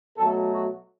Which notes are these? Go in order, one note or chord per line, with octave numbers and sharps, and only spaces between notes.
B2 F#3 A3 A4
F#4